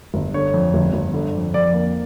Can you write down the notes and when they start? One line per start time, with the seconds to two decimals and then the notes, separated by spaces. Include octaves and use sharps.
0.14 G1
0.34 D3 C#5
0.54 F2
0.74 G1
0.94 G1
1.13 D3
1.35 F2
1.54 F2 D5
1.74 A#3